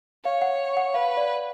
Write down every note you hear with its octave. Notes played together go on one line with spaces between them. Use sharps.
C#5 F5
F#5
F#5
B4 F5
D5